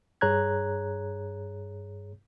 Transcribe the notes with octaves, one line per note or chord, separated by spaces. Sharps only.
G2 G#4 C#5 A#5 F#6 G#6